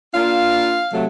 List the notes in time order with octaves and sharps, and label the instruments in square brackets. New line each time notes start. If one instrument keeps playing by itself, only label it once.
[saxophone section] A#3 D4 F4 [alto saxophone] F5
[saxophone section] C3 F#3 A3